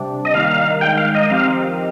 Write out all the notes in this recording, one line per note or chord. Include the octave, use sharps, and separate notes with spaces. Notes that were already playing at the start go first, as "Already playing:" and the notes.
Already playing: C3 G3 D4
D#5
D#3 G3 A#3 D#4 F5
D#3 G#3 D#4 A#4 G5
F5
D#5
F3 C4 D#4 G4 A#4 F5